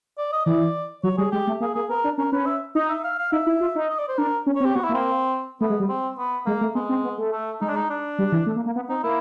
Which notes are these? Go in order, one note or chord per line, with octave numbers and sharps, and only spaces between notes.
D5
D#5
E3 D5
F#3 C#5
G3 G#4
G#3 G4
A3
A#3 G#4
A#3 G#4
B3 A#4
D4
C#4 A#4
C#4 B4
E5
D#4 D#5
E5
F5
F5
D#4 E5
E4
F4
D#4
D#5
D5
C5
D4 A#4
C#4
C#5
C4
G4
B3 F#4
E4
A#3
C4
A3 B3
G#3
G3
C4
B3
G#3 A#3
A3
G#3 B3
C4
B3
A3
A3
G#3 D#4
D4
D#4
D4
G3
E3
A3
A#3
A#3
B3
C4 D#4
A#3 E4